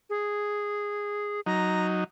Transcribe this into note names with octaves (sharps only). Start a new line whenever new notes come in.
G#4
F#3 D#4 A#5